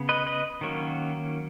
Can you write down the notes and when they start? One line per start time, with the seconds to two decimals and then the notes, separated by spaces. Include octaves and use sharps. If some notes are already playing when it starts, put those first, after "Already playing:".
Already playing: C#3 B3
0.09 B4 D#5
0.27 B4 D#5
0.61 D#3 F#3 A#3 C#4